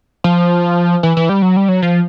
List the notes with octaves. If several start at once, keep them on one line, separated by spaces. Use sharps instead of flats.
F3
E3
E3
G3
F#3
G3
F#3
F3